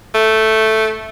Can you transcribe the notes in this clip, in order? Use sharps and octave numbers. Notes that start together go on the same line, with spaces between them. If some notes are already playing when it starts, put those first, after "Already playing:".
A3